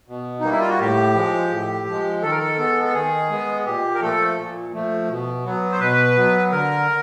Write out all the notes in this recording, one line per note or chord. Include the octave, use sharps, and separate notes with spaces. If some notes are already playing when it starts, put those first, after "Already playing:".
B2
G3 A#3 D#4
E4
F4
F#4
A2 G4
F3 G#3
A2
F3 G#3
D#3 A4
A#4
A4
G#3 B3
A4
D#3 G#4
G#3 B3
A#2 G4
A#4
F3 A3 A4
A#2
F3 A3
B2
F#3 B3
C5
B2 B4
F#3 B3
D3 A#4